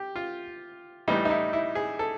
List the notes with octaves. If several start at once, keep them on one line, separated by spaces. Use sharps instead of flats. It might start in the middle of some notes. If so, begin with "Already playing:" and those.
Already playing: G4
F4
A2 E3 G3 D#4
D#4
E4
E4
G#4
A4